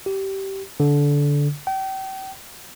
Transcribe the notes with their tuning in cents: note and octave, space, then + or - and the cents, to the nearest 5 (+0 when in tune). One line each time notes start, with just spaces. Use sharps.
G4 -20
D3 -20
G5 -35